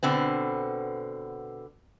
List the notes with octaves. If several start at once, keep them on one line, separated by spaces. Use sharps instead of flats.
B2 D3 B3 C4